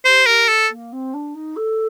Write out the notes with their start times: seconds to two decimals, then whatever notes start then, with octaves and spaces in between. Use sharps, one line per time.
0.05 G4 C5
0.26 G4 A#4
0.48 A4
0.69 A#3
0.92 C4
1.13 D4
1.34 D#4
1.56 A4